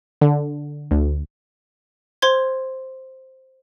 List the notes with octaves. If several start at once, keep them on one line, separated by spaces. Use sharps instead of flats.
D3
D2
C5 C6 G#6